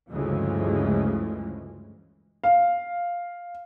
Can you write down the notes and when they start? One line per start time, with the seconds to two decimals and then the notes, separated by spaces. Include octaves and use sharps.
0.11 D2 G2 C#3 E3 F3 G#3
2.44 F5